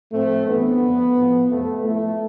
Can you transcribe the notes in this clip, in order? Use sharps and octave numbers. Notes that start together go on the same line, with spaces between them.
A2 F3 A3 C4
G2 E3 B3
F2 D3 F3
A2 F3
F2 C3 F3 A3
A2 F3 A3